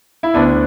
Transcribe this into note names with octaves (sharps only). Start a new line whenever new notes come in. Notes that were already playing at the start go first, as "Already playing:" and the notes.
E4
D2 D3 B3 D4